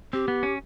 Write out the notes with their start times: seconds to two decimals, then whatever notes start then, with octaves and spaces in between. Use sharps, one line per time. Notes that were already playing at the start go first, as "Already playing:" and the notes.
0.13 C4 G4
0.28 B3
0.43 C#4